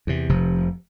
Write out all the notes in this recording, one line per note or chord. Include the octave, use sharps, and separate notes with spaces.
E2 C3
F1 C3 F3